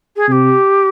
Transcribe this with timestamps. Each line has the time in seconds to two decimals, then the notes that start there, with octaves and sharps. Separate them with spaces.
0.16 G#4
0.27 C3 G4 G#4